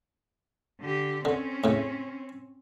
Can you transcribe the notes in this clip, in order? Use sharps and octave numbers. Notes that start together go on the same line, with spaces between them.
D3 G4
D3 C4 C#4
A2 C#3